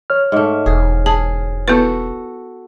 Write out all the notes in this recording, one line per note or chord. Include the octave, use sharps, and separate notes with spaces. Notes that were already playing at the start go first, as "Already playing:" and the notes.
C#5 F6
G#2 A3
E1 G#4
G#4 A5
B3 E4 F#4 A4 B4